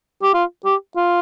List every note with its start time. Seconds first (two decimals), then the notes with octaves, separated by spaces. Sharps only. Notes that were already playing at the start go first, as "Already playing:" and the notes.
0.23 G4
0.34 F4
0.65 G4
0.96 F4